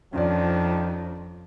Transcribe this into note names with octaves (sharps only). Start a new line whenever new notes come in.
F2 D#3 F3 C#4 D4 F4 D5